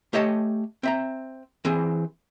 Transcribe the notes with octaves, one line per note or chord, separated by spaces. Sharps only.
A3 G4 C#5 D#5 A5
C4 E5 A#5
E3 C4 G#4